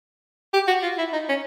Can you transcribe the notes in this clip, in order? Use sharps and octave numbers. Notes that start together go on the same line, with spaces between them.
G4
F#4
F4
E4
D#4
C#4